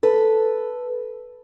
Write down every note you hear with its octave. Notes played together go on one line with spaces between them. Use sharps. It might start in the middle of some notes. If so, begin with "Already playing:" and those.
A4 B4